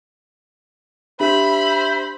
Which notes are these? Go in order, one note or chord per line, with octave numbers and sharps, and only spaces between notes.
D4 G4 C5 E5 B5